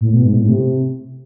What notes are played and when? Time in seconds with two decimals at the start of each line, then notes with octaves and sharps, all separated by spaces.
0.01 A2
0.13 B2
0.25 G#2
0.37 A2
0.49 C3